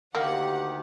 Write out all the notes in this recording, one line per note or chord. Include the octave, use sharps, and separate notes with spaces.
D2 D#3 A#3 G4 F#5